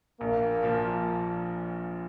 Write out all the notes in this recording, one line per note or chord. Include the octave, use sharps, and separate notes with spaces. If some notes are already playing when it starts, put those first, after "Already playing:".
A#1 A#3
A#2 F3